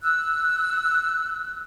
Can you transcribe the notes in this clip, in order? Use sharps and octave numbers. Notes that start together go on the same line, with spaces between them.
E6 F#6